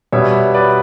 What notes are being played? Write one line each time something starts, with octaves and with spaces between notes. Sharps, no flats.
B2 G3 B3 C#5 E5
B4 D5